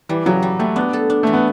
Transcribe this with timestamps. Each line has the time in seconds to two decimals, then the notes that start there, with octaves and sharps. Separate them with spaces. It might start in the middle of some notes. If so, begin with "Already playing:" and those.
0.09 E3 G3
0.26 C#3 F#3
0.42 G3
0.59 G3 A3
0.76 B3 D4
0.93 A4
1.10 D4
1.23 E3 A3
1.33 B3